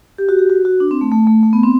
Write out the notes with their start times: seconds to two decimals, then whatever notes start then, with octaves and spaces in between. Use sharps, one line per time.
0.18 G4
0.29 F#4
0.39 G4
0.50 F#4
0.65 F#4
0.80 D4
0.91 C4
1.01 A3
1.12 A3
1.27 A3
1.43 A3
1.53 B3
1.63 C4